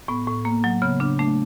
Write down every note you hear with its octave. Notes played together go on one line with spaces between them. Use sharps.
A2 B3
A2
A#3
F#3
C#3 B3
C#3 D4
A3 D4